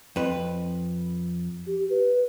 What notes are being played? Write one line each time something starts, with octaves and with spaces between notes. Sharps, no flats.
F2 B4
G4
B4